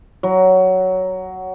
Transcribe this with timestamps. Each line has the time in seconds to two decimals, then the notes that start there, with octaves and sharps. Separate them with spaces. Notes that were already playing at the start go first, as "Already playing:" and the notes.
0.23 F#3